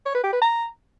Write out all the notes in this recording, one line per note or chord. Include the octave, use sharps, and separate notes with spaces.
C#5
B4
G4
B4
A#5